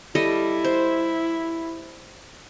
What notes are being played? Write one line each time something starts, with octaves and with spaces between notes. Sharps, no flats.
G3 E4 A4 D#5
C5